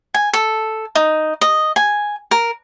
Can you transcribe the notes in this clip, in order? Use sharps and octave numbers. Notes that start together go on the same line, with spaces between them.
G#5
A4
D#4
D#5
G#5
A#4